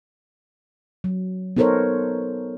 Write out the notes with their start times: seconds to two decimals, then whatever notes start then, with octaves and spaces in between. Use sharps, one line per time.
1.04 F#3
1.57 B3 D#4 A4 A#4 C5 C#5